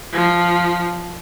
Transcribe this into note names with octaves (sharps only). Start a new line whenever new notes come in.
F3